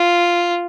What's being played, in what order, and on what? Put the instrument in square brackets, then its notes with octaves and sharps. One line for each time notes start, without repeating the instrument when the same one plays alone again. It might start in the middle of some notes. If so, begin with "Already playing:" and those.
Already playing: [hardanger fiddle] F4